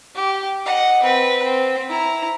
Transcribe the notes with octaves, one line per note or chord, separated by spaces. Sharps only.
G4
D#5 F#5
C4 B4
C4
E4 A#5